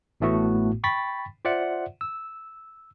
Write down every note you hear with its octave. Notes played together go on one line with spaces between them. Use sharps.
A1 A2 A3 B3 F#4
G5 B5 C#6 A6 B6
F4 C5 D5 E5 F#5
E6